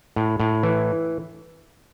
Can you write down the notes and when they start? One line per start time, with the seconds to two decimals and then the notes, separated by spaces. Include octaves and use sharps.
0.16 A2
0.40 A2
0.63 E3